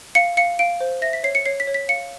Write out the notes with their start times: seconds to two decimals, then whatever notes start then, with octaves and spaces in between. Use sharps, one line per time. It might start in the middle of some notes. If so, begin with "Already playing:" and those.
0.15 F5 C#7
0.37 F5 C#7
0.59 F5 D7
0.80 C5
1.02 E5 A#6
1.13 B6
1.23 C#5 C7
1.35 C#7
1.46 C#5 C7
1.60 B6
1.67 C#5
1.74 B6
1.89 F5 C#7